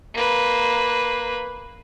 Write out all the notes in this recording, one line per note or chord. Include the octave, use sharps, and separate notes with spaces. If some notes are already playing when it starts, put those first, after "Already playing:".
A#3 B4